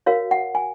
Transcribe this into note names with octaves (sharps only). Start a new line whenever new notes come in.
F#4 A#4 C#5 F5
F#5
G#5